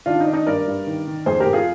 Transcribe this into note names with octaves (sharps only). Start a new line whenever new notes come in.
D#3 D4 F4
D#4
D#3 D4
D#4
G2 A#4 D5
G2
D#3
D#3
F2 G#4 C5
G4 A#4
F2
F4 G#4